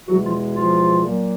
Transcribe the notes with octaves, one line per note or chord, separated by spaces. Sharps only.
E2 B2 F#3 G#3 F#4
F3 F4
F3 F4
A#2 F#3 A#3